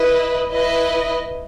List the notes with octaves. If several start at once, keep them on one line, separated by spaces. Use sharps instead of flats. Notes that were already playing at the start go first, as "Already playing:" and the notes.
Already playing: E4 B4 D#5
E4 B4 D#5